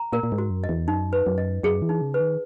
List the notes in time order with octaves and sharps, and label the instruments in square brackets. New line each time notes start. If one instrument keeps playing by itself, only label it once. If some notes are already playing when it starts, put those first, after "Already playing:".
Already playing: [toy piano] A#5
[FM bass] A#2 [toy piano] A#4
[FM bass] A#2
G#2
[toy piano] F#4
[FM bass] F#2
[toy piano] D#5
[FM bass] E2
[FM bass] F#2 [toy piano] D#4
[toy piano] B4
[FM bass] F#2
[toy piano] D#5
[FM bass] F#2 [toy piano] G#4
[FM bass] E3
[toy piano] D#4
[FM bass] C#3
[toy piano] B4
[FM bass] D#3